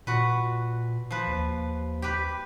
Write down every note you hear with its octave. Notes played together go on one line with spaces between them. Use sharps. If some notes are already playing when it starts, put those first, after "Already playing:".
A#2 F#4 B4
F3 B4
D#2
G4 B4